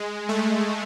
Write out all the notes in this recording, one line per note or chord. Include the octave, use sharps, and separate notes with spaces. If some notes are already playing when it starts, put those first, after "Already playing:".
Already playing: G#3
A3